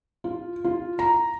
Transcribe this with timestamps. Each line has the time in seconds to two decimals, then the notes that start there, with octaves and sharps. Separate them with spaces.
0.24 F4
0.64 F4
0.99 A#5